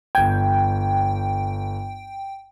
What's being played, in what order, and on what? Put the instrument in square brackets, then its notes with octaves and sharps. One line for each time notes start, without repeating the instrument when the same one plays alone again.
[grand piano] G1 G#6 [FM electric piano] G5